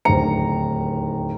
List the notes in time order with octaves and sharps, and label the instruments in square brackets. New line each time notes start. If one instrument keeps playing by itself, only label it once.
[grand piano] D1 D#2 C#7 [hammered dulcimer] A#5